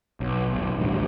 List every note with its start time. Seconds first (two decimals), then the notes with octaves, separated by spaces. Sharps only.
0.20 B1
0.52 F1 B1
0.79 A1 D2 G2